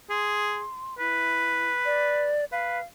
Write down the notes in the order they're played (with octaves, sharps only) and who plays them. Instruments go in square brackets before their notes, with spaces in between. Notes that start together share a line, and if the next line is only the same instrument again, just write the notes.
[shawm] G#4 [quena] C6
[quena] E4 [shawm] B4
[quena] D5
[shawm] B4 [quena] F5